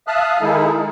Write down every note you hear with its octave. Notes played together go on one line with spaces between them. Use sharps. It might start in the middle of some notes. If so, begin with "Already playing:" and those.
E5 F5 A5 D#6 F6 F#6
D#3 G#3 D#4 E4 G#4 A4